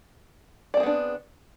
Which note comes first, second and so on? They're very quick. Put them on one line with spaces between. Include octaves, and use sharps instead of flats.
D5 C4 G#4 B3 D4